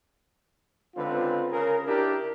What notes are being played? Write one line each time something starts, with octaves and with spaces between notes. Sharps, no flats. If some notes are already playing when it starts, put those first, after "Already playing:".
C#2 D3 C4 F4 B4
C#3 G#4 A#4
D4 E4 G4 A#4